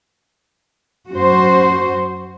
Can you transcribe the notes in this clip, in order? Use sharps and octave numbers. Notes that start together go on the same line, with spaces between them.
F#2 F#4 C5